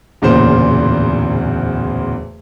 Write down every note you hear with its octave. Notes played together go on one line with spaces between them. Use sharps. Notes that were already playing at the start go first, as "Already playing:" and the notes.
D1 E2 A#2 C#3 C5